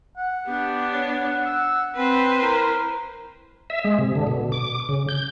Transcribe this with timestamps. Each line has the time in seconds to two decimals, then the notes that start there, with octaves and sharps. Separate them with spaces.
0.18 F#5
0.47 B3 D4 G4
0.93 C#5
1.45 E6
1.96 C4 B4 C5
2.42 E4 A#4
3.70 E5
3.84 G#3
3.98 C3
4.15 D3
4.27 B2
4.52 D6
4.89 C#3
5.09 G6